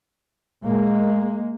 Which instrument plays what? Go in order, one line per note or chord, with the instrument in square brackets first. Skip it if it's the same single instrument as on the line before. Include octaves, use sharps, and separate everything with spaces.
[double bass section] A#2 G#3 A#3